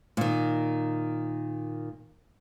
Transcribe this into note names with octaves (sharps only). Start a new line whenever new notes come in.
A#2 D#3